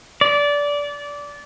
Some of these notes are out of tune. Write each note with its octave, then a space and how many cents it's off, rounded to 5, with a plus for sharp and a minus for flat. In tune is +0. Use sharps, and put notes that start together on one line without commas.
D5 -20